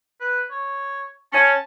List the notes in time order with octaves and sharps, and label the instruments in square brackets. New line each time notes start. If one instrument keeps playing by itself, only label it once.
[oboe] B4
C#5
[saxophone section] C#4 [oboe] A5